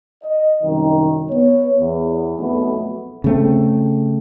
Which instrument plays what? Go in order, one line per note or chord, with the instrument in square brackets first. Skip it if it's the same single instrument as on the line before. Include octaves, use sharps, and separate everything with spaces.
[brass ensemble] D#5
C2 F#2 D#3
B3 C#5
E2
B1 F2 B2 A3 B3
[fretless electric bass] C#3 A3 C4